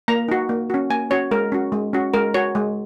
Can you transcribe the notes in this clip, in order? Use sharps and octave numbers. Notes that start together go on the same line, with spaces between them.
A#3 A#5
D#4 F#4
A#3
C#4 F#4
A#3 G#5
C#4 F#4 C#5
G#3 A#4
C#4 F#4
G#3
C#4 F#4
G#3 A#4
F#4 C#5
G#3